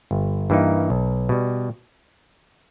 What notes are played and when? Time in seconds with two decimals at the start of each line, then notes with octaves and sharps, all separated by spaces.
0.11 G1
0.50 G2 E3 A#3 D#4
0.90 B1
1.29 B2 G3